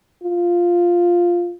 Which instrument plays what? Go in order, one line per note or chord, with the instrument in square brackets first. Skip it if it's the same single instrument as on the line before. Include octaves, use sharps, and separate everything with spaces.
[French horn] F4